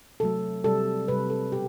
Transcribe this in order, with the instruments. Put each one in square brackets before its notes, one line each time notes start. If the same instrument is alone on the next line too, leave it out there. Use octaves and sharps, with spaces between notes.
[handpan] C3 F#3 A3 A4
C3 G3 A4
C3 G3 B4
A4
B2 G4